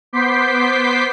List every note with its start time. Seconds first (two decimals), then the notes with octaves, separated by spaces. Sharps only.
0.13 B3 C5 D6 G6 B6 C7